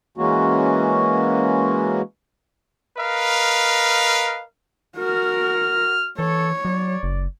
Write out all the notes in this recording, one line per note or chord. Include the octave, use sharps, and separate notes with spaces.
E3 G#3 A#3 C#4 F#4
A#4 B4 D#5 F5
F#4 A#4 F6
E3 A4 C#5
F#3 D5
F#1